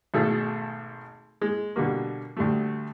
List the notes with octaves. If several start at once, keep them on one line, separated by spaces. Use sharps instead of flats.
G#1 B2 A3 G#4 A4
G#3
B2 D3 G3 A#3
D2 G3 A3